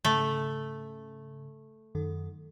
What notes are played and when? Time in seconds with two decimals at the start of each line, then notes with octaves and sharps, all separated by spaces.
0.05 G#2 C#3 A3
1.95 F#2 D#3 A4